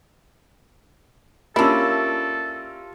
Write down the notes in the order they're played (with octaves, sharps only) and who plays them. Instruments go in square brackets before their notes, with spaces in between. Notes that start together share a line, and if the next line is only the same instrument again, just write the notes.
[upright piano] A#3 C#4 [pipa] D4 E4 [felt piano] F4 G4 E6 [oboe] A4